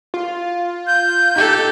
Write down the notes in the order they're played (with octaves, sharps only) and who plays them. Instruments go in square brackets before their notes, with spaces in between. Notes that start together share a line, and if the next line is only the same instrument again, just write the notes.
[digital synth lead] F4
[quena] G6
[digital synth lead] D#4 [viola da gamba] G4 A4